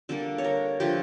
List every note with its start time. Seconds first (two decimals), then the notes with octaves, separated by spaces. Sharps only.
0.09 D3 G3 A#3 A4
0.38 C#5
0.44 A#4
0.80 D3 F3 A3 G4